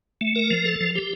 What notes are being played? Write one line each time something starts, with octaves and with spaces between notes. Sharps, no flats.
A3
A#4
F3
A4
F3
G4